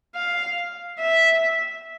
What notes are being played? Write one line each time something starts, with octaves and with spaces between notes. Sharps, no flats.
F5
E5